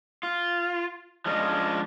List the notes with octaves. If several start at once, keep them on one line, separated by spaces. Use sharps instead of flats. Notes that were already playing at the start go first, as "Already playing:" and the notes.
F4
F3 G#3 C#4 D4 F4 D#5